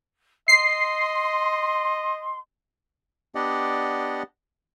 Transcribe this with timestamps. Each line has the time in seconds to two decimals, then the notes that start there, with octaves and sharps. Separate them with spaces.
0.48 D#5 C6 C7
3.35 B3 D4 G4 D5 D#5 F#5